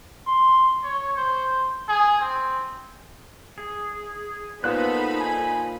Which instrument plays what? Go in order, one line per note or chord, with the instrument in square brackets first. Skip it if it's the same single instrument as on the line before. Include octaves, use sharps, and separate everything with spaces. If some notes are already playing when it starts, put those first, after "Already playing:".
[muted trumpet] C6
C#5
C5
G#4
C4
[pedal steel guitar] G#4
[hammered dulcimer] A#2 [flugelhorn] B3 [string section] D#4 C5 B5 [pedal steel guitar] A4 C6 F#6
[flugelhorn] G#5